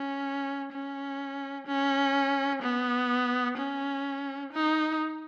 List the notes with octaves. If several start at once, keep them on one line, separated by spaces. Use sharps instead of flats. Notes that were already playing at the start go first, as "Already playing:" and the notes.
Already playing: C#4
C#4
C#4
B3
C#4
D#4